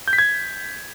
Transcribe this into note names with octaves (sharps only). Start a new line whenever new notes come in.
G6
B6
G#6